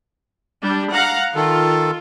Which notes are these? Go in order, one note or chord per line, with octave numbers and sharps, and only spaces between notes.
G3 D4
F5 F#5 A#5
D#3 F4 A4